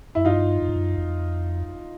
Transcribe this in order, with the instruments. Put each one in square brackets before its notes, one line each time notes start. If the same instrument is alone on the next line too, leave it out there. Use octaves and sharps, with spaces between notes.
[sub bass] F#2 [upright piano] E4
[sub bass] G2 [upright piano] D#4 F4
[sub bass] F#2
G2
F#2
F2